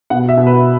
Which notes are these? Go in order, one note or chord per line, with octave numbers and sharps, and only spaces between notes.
B2 F#5
E5
B2
B4